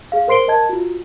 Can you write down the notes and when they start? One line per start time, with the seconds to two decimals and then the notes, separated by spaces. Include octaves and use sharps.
0.12 G#4 F5
0.28 A#4 C5 C6 C7 D7 G7
0.48 A#4 D#5 A5 G#6
0.69 F4 F#4